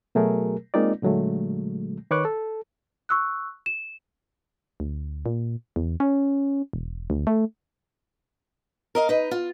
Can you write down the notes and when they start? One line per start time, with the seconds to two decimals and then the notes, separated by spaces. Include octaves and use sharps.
0.15 B2 F#3 A3 G#4 A#4
0.74 G#3 A#3 C4 D#4 F4 D5
1.02 A#2 D3 F#3 G#3 A3
2.11 D#3 B4 C#5 C#6 D6 F#6
2.25 A4
3.09 C#6 E6 F#6
3.66 E7
4.80 D2
5.26 A#2
5.76 E2
6.00 C#4
6.73 E1
7.10 D2
7.27 A3
8.95 A#4 D#5 F5
9.09 D#4 B4
9.31 F4